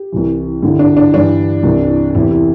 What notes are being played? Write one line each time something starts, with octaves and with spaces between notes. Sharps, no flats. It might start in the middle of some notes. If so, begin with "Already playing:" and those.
Already playing: G4
C2 C3 E3
G2 D3 E4
D4
D4
G2 E3 D4
C2 C3 E3
E2 C3 E3 E4
G4
E4